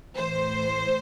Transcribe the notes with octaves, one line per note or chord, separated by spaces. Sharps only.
A2 E3 C5